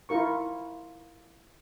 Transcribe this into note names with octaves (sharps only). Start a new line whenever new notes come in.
E4 F4 A#4 C#6